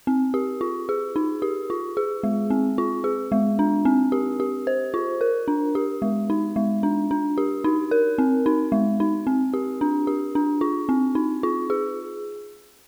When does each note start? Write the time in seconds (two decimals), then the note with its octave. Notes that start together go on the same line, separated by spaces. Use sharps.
0.07 C4
0.34 G4
0.61 F4
0.89 G#4
1.16 D#4
1.42 G4
1.70 F4
1.97 G#4
2.23 G#3
2.50 C4
2.78 F4
3.04 G#4
3.32 G#3
3.59 D4
3.85 C4
4.12 G4
4.40 G4
4.67 C5
4.94 F4
5.21 A#4
5.48 D4
5.75 G4
6.02 G#3
6.30 D#4
6.56 G#3
6.83 D4
7.11 D4
7.38 G4
7.64 D#4
7.91 A#4
8.18 C4
8.46 D#4
8.72 G#3
9.00 D#4
9.27 C4
9.54 G4
9.81 D4
10.07 G4
10.35 D4
10.61 F4
10.89 C4
11.15 D#4
11.43 F4
11.70 G#4